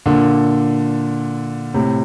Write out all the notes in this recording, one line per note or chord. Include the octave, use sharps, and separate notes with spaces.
A#2 D3
A2 C3